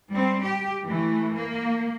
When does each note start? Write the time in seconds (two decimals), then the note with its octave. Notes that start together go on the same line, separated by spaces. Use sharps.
0.11 G3 C4
0.43 G4
0.84 E3 A3
1.33 A#3